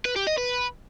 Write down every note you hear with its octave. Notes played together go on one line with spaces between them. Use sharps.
B4
G4
D#5
B4